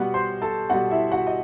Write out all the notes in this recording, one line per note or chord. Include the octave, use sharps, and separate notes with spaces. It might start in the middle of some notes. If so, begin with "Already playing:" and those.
Already playing: B2 G3 B3 F#4 F#5
C5 C6
A4 A5
B2 G3 B3 F#4 F#5
E4 E5
F#4 F#5
D#5